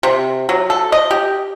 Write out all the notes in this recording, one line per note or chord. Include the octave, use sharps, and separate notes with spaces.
C3
F#3
A4
D#5
G4